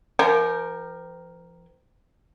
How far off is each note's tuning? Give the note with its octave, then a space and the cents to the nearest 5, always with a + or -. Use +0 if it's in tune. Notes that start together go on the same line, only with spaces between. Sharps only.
F3 -40 A#4 +0 G5 -5